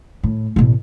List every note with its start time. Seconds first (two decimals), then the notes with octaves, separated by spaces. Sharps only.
0.23 A2
0.56 A1 B2